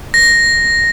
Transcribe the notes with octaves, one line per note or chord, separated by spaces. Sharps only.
A#6